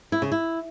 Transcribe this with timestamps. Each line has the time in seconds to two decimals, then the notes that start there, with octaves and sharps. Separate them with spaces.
0.12 E4
0.22 C#3
0.32 E4